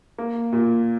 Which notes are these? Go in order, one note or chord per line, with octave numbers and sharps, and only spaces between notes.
A#3
A#2